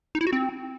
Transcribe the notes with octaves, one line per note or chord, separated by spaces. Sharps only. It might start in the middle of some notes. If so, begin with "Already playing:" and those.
D#4
E4
F#4
C4